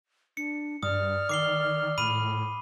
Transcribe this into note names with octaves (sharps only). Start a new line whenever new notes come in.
D4 C#7
G2 D5 D#6 F6
D#3 D6 C7 G7
A2 B5 D#7